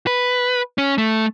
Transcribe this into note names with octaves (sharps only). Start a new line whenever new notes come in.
B4
C#4
A3